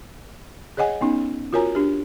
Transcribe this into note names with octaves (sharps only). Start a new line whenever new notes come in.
G#4 C#5 D#5 F#5 G#5
B3 C#4 D#4
F4 F#4 A#4 C#5 G#5 A#5
D4 G4